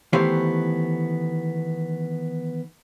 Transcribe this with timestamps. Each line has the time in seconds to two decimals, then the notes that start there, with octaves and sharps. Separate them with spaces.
0.13 D#3 E3 A3 B3 G4 C5